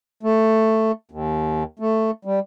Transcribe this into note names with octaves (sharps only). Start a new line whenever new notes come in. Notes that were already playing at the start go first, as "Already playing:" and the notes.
A3
D#2
A3
G3